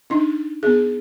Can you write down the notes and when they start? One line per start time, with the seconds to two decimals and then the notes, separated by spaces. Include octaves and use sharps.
0.10 D4 D#4
0.63 B3 G#4